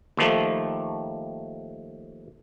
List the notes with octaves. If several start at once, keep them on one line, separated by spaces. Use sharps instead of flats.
D#2 D#3 F3 A3